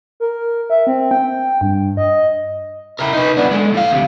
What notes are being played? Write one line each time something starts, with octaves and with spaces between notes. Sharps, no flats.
A#4
E5
C4
G5
G2
D#5
E4 A#4
D#4 B4
B3 D4
G#3 A3
A2 F5
D2 C3